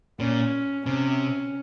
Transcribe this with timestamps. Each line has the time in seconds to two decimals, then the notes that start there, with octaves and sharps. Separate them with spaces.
0.20 A#2 C#4
0.86 C3 C#4